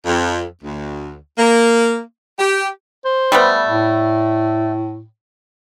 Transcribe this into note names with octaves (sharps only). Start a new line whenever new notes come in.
F2
D2
A#3
G4
C5
G3 A3 B3
A2